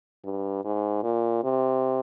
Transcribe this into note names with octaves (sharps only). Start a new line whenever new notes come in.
G2
G#2
A#2
C3